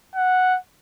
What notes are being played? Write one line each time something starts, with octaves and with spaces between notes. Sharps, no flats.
F#5